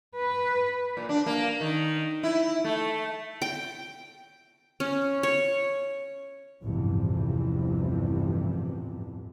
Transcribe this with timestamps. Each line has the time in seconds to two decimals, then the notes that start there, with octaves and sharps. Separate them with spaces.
0.16 B4
0.97 A#2
1.09 D4
1.26 A#3
1.61 D#3
2.23 E4
2.64 A3
3.42 G5
4.80 C#4
5.23 C#5
6.62 A1 E2 G2 C3 E3 F3